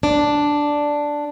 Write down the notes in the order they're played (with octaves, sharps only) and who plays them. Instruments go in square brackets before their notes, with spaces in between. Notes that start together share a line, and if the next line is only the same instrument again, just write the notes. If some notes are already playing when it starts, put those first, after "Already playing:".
[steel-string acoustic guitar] D4